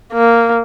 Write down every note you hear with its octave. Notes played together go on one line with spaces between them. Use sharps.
A#3